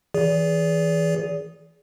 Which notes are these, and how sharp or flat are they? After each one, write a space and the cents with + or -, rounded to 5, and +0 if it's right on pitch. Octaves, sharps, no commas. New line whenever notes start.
E3 +0 G#4 +0 D5 -30